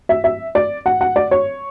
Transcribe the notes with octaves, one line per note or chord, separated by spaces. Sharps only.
E5
E5
D5
F#5
F#5
D5
C#5